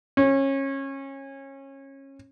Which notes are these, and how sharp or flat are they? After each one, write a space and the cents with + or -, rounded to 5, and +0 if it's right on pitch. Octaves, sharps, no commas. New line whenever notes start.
C#4 -25